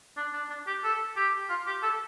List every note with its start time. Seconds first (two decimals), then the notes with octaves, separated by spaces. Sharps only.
0.17 D4
0.33 D4
0.50 D4
0.67 G4
0.84 A4
1.16 G4
1.50 F4
1.67 G4
1.82 A4